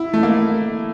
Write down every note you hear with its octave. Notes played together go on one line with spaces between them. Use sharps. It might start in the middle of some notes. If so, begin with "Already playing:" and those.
Already playing: E4
A3
A#3